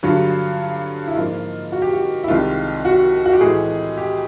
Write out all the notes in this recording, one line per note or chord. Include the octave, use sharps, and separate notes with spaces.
G2 D3 F#3 F4
E4
G#2 F3 A#3 F4
F#4
G4
F#4
E4
C2 C3 D#3 G#3 F4
F#4
F#4
G4
A2 E3 G#3 G#4
G4